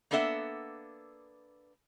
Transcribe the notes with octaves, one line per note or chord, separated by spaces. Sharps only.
A#3 B3 D4 A4 E5 F#5